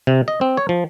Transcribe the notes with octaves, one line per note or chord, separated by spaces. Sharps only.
C3
D#5
C4
C#5
F3